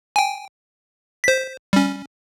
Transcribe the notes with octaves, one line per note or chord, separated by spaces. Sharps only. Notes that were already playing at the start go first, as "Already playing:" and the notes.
G5 G#5
C5 B6
G3 C#4